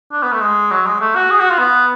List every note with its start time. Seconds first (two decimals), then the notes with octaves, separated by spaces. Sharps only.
0.12 D4
0.23 B3
0.33 A3
0.41 G#3
0.71 F#3
0.86 G#3
1.01 A3
1.15 F#4
1.31 G#4
1.40 F#4
1.50 F4
1.59 B3